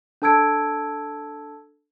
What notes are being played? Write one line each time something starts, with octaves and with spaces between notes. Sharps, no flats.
D4 A4 A5 E6 G#6 D7